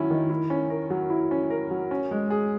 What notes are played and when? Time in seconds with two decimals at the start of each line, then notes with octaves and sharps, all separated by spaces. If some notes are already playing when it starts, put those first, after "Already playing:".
Already playing: D#3 F#3 C#4 E4
0.11 D#3
0.30 E4
0.50 C#4
0.70 A#4
0.90 F#3
1.10 E4
1.31 C#4
1.50 A#4
1.71 F#3
1.91 C#4
2.11 G#3
2.30 G#4